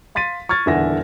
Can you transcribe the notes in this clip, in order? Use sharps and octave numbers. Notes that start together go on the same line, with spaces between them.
F5 C6 A6 B6 D#7
C#6 F6 G#6 A6
D#1 E2 D3 E5 F#5 A#6